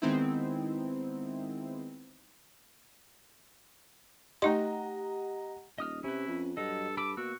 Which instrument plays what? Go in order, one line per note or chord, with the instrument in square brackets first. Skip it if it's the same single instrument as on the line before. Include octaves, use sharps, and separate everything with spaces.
[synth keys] D#3 G#3 B3 C4 D#4 E4
[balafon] A3 D#4 C6 [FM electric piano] G4 F#5 A#5 [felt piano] D#5
[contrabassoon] D#1 [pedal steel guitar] D#5 D#6 F6
[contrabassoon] C3 [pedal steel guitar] C#4 B4 [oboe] E4
[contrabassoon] F2
[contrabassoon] G2 [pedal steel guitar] F#3 D#5 [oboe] A4
[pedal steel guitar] A4 B5 E6 [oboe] D6
[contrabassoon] B2 [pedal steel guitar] A#3 E6 [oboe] F#4